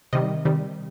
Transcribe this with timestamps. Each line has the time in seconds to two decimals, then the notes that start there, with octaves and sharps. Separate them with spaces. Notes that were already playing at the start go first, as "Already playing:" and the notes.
0.13 C3 D#3 G3 D#5
0.45 C3 D#3 G3